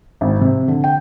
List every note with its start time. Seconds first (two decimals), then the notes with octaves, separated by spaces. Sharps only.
0.21 G#1
0.41 C3
0.68 D3
0.84 G5